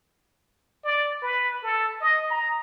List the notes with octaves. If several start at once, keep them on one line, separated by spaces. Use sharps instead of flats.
D5
B4
A4
D#5
A#5